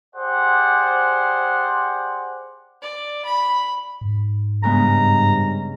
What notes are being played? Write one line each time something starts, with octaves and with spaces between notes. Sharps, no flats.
G4 G#4 C5 D5 F#5
D5
B5
G#2
G2 C#3 G#3 B3 A#5